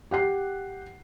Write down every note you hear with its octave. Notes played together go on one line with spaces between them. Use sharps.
G4 F#5 C7